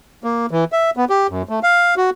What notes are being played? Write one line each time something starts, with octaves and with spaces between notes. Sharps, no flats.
A#3
E3
E5
B3
G4
F#2
A3
F5
F#4